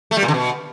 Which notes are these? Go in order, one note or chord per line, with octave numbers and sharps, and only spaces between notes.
A3
G3
A#2
D3
B2